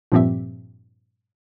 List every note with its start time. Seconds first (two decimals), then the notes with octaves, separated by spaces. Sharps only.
0.12 G2 A#2 F3 C4 G4 E5